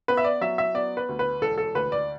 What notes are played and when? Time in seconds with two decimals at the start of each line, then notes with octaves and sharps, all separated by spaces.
0.08 B3 B4
0.17 E5
0.24 D5
0.41 F#3 E5
0.58 E5
0.74 B3 D5
0.97 B4
1.09 D2
1.19 B4
1.41 E1 A4
1.58 A4
1.75 D2 B4
1.92 D5